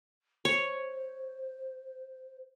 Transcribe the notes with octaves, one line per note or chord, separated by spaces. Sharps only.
C5 C#5